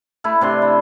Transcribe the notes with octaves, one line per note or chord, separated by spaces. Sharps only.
A3 E4
C3 D4 C6
E4